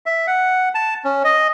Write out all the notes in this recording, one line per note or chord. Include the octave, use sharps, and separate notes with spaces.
E5
F#5
A5
C#4
D#5